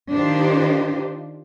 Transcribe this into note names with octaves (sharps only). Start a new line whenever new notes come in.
D#3 D4 D#4 F4 G4 C5